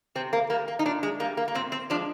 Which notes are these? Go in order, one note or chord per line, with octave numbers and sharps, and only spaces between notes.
C3 C4
A#3
G3 A#3
A#3
D#4
A#2 D4
G#3
G3 A#3
A#3
A#3
A#2 C4
C4
F3 G#3 D4